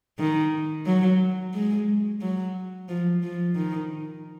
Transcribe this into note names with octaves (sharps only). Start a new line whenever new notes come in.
D#3
F#3
G#3
F#3
F3
F3
D#3